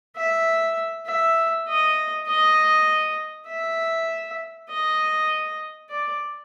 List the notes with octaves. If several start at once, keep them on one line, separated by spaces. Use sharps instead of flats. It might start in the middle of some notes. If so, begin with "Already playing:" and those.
E5
E5
D#5
D#5
E5
D#5
D5